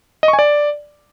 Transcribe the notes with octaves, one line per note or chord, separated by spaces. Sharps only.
D#5
C#6
G#5
D5